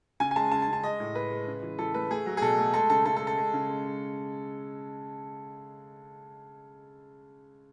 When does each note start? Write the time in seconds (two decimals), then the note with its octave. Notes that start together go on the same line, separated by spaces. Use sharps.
0.20 C#3 G#5
0.31 G#5
0.36 G#3 A5
0.52 C#3 A5
0.62 A5
0.68 C#3
0.73 A5
0.84 G#3 D#5
1.00 A2
1.15 G#3 B4
1.31 G#3
1.47 C#3
1.63 E3
1.79 E3 A4
1.94 A3 B4
2.10 A3 G#4
2.26 F#3
2.37 G#4
2.42 B2 A4
2.58 A3
2.74 G#3 A4
2.90 C#3 A4
3.06 C#3 A4
3.17 A4
3.22 G#3
3.27 A4
3.37 G#3
3.53 C#3
3.69 G#3
3.85 G#3